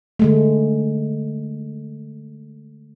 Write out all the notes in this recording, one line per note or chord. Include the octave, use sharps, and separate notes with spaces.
D3 G#3 A3